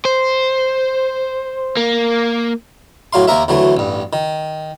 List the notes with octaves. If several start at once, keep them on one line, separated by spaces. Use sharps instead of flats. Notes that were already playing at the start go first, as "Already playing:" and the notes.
C5
A#3
A2 F#3 F5 C6
D#2 A#3 A#4 E5
D2 E3 F#3 A3
A1 G2
D#3